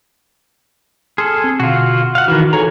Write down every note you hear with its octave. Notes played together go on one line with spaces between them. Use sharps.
G#4 A4 C6 D#6 F6
C4
B2 D3 F4 F#4 F5
F5 F#5
D#3 E3 F#4
G#4 A4 C#5 A#5